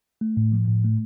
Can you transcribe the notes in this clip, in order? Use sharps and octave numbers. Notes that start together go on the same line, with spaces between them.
A3
A2
F3
A2
A3